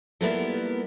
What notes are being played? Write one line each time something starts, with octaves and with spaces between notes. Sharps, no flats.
G3 A#3 B3 E4 F4 A4